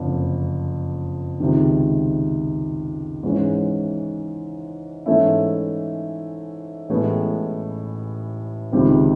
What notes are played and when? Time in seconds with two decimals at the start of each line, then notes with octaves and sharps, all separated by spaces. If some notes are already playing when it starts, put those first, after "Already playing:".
Already playing: F#1 F2 D3
1.40 C#2 C3 D#3
3.23 G#2 E3 G#3 C#4
5.06 G#2 E3 A3 C#4 E4
6.89 A1 A2 E3 G#3 B3
8.72 C#2 C3 D#3 G3 C4